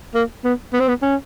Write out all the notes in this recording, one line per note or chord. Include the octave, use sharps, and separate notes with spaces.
A#3
B3
B3
C4
B3
C#4